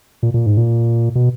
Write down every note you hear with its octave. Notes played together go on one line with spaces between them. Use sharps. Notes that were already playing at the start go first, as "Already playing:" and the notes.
A#2
A#2
G#2
A#2
B2